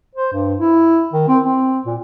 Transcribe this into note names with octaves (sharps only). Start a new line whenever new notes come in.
C5
G2
E4
D#3
C4
C4
A#2